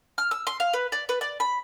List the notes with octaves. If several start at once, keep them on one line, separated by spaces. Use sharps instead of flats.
F6
E6
C6
F5
B4
D5
B4
D5
B5